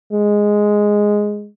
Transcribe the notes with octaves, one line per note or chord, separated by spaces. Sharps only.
G#3